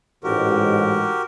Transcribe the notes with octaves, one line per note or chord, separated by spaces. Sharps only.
A1 G#2 F#4 G4 A#4